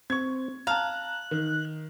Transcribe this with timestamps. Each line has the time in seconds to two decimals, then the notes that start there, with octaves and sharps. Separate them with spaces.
0.10 C4 C#6 G#6
0.67 F5 A5 A#5 F#6
1.31 D#3